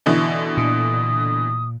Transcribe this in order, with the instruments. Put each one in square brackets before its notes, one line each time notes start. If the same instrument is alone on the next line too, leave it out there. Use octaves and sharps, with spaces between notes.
[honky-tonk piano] B2 D3 E3
[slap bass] A#2 [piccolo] D#6